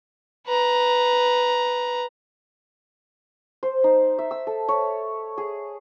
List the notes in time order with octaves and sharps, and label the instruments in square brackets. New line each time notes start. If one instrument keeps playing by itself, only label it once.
[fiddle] B4 A#5
[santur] C5
D#4
E5
E6
A4
C#5
G#4